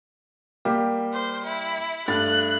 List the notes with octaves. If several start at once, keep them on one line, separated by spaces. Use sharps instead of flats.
G3 A#3 G4
C5
E4
G2 A3 F#6 A6